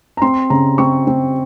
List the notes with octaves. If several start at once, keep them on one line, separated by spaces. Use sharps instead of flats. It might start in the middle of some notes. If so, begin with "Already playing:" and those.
A#5
C4 C6
C#3 A#5
C4 C#6
C4